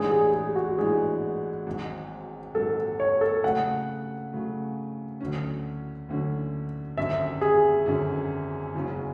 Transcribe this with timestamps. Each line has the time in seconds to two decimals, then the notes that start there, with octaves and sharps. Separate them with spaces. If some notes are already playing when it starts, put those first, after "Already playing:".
Already playing: A1 G#2 E3 G#3 D4 G#4
0.11 G#4
0.34 G#4
0.56 F#4
0.78 A1 G#2 E3 G#3 D4 G#4
1.67 G#1 G#2 F#3
2.55 G#1 G#2 F#3 A4
3.00 C#5
3.21 A4
3.43 C#3 F#3 A3 F#5
4.32 C#3 F#3 A3
5.21 D2 D3 F#3 C#4
6.09 D2 D3 F#3 C#4
6.97 G#1 F#2 D3 F#3 C#4 E5
7.41 G#4
7.86 G#1 F#2 D3 F#3 C#4
8.75 F#1 E2 C#3 F#3 C#4